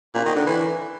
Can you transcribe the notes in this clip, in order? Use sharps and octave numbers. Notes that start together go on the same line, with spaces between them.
A#2
D#3
D3
E3